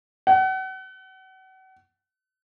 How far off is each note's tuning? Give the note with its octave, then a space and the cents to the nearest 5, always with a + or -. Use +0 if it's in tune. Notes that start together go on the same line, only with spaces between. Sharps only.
F#5 +35